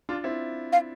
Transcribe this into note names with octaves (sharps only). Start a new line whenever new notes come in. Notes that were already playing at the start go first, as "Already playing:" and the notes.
D4 F4
C4 E4
F5